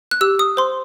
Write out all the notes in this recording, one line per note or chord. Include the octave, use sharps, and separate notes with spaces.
F#6
G4 E6
D#6
C5 C6